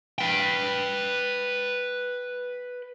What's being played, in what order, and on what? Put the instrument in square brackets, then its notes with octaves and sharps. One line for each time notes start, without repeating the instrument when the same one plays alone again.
[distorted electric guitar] B4 G5